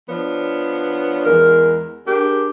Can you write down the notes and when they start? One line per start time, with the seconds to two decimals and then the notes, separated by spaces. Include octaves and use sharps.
0.10 F3 B3 D4 C#5
1.25 E2 G#3 A#4
2.06 D4 G4 G#4 A#4